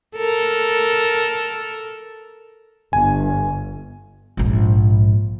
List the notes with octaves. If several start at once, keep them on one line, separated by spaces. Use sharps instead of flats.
A4 A#4
G1 G#5
A#1 G#2